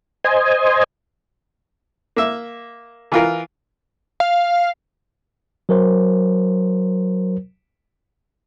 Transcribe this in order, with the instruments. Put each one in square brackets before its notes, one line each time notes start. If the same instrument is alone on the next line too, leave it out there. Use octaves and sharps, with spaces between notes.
[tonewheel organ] C5 D#5 G#5
[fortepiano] A#3 E5
E3 F4 A#4
[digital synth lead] F5
[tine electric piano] F#3 A#4 C5